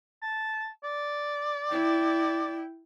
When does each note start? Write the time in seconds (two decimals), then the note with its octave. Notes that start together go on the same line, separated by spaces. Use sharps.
0.22 A5
0.84 D5
1.71 E4 G5